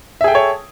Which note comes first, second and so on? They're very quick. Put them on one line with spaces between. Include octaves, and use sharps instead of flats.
E5 G#4 G5 A4 C#5